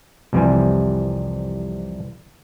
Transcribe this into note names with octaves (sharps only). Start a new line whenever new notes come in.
C2 F2 C3 E3 G3 G#5